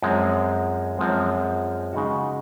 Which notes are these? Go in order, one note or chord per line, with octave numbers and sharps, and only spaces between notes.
F#2 F3 G#3 C4
F#2 F3 G#3 C4
C#3 G#3 D#4 F#4